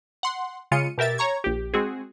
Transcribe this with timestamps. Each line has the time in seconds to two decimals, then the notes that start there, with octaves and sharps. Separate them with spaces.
0.23 F#5 C6
0.72 C#3 G#3 F4 C#7 D#7
0.98 B2 G4 A#4 E5 A6
1.18 C#5 A#5 C#6 G#6
1.44 A#1 G4
1.74 G#3 C4 F#4 G#4